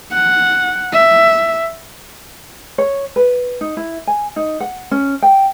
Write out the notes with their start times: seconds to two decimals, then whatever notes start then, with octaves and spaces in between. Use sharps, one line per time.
0.12 F#5
0.93 E5
2.78 C#5
3.16 B4
3.61 D#4
3.77 E4
4.07 G#5
4.36 D#4
4.60 F#5
4.91 C#4
5.22 G5